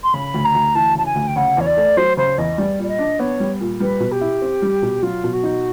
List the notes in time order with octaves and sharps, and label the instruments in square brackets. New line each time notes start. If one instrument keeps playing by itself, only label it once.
[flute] C6
[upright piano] C#3 [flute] B5
[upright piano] D2
[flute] A#5
[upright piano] D2
[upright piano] E3 [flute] A5
[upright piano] C#3 [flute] A5
[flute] G#5
[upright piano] D2
[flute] G5
[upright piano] C#3 [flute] F#5
[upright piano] E2 [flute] C#5
[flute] D5
[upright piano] A3
[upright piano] F#3 [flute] C5
[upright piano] C#3 [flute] C5
[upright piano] E2 [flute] D#5
[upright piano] G3 [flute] D5
[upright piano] A#2 [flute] D5
[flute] D#5
[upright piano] D4
[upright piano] B3 [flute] C#5
[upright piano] G3
A#2
[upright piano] G3 [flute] B4
[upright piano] B2
[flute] G4
[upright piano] E4
C4
G3
B2
[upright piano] F#3 [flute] F4
[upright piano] B2
[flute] F#4
[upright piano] D#4